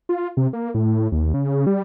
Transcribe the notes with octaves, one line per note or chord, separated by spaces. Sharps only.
F4
C3
A#3
A2
D#2
C#3
G3